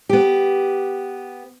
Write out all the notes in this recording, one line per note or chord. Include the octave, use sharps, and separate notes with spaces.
B3 G4